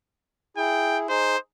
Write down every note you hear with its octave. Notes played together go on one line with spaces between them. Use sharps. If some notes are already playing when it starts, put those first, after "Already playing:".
E4 G#4 G5
D#4 G#4 C5